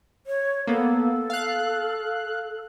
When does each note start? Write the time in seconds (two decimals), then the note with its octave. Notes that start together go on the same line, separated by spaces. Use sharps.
0.27 C#5
0.67 A#3 B3 A4
1.30 F5 F#6